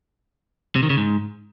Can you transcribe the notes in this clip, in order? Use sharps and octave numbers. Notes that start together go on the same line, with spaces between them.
C3
D#3
C#3
G#2